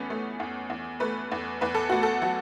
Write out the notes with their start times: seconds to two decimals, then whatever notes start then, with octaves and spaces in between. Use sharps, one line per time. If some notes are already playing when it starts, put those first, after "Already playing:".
Already playing: E2 E3 A3 B3 C#4
0.10 A3
0.40 E2
0.70 E2
1.00 A3 B4
1.32 E2
1.61 E2 B4
1.75 A4
1.89 A3 F#4
2.03 A4
2.22 F#3 F#4